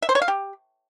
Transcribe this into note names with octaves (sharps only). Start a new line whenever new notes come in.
E5
C5
C#5
F5
G4